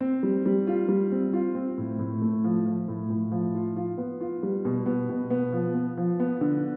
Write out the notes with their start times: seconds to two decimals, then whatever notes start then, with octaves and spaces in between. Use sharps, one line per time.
0.01 C4
0.23 G3
0.45 G3
0.67 F4
0.88 G3
1.12 C4
1.33 F4
1.55 C4
1.78 A2
1.99 A2
2.22 A3
2.44 F3
2.66 F3
2.88 A2
3.10 A2
3.32 F3
3.55 F4
3.76 F4
3.98 B3
4.20 F4
4.43 G3
4.65 B2
4.86 B3
5.09 B2
5.30 B3
5.53 F3
5.74 B3
5.97 F3
6.20 B3
6.41 D3